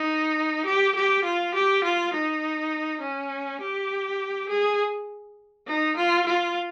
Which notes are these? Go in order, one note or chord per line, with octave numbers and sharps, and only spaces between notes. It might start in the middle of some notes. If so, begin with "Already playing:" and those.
Already playing: D#4
G4
G4
F4
G4
F4
D#4
C#4
G4
G#4
D#4
F4
F4